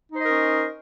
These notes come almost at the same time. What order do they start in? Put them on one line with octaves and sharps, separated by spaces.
D#4 C5 D#5 A#4 C#4